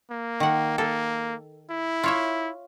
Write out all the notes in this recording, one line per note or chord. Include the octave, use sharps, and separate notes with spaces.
A#3
D#3 F#5
A#3 A4
E4
F4 C#5 E5